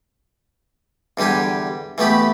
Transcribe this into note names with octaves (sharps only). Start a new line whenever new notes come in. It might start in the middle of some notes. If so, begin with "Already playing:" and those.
E2 D3 G3 G4 G#5
E3 A3 B3 G4 B5